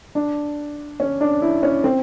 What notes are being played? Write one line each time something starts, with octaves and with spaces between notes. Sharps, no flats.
D4
C#4
D4
E4
C#4
C4